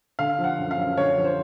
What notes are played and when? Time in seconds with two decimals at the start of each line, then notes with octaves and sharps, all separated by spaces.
0.19 D3 F5
0.39 F3
0.44 F#5
0.58 F#2
0.71 F5
0.77 F#2
0.97 D3 C#5
1.17 F3
1.24 C5